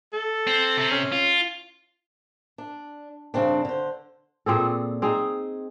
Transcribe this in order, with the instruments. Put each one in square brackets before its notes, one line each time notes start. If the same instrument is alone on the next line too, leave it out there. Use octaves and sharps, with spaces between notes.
[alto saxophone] A4
[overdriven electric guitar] C4
C3 C4
[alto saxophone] C#4
[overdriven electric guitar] F4
[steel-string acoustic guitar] D4
G2 C#3 C4 D4
D3 C5
[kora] A#2 C4 G#4 A4
C4 D#4 G#4